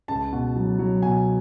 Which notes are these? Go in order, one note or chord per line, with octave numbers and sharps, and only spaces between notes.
C#2 A5
B2
F#3
F#3
B2 G#5